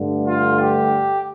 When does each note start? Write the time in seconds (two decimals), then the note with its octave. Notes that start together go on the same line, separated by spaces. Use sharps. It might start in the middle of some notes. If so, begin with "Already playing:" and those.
Already playing: G2 D3 A3
0.24 F4
0.58 G4